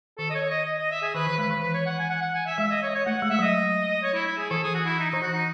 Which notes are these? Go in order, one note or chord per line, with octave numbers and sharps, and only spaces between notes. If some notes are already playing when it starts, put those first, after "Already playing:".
D#3 A4
D#5
C#5
D#5
D#5
D#5
E5
G#4
D#3 B4
E3 B4
G#3 B4
E3 B4
B4
C#5
F#5
G#5
F#5
F#5
G#5
E5
G#3 E5
D#5
C#5
D#5
C#5
A3 F#5
G#3 F#5
E5
F#3 D#5
C#5
E4
E4
G#4
E3 A4
G#4
F#4
E4
D#4
E3 D#4
F#4
D#4